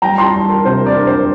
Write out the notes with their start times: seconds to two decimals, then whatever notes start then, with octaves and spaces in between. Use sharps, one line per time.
0.02 G3 G5 A#5
0.18 A5 C6
0.34 G3
0.49 A#4
0.65 C3 C5
0.86 A#4 D5
0.97 D4
1.07 C5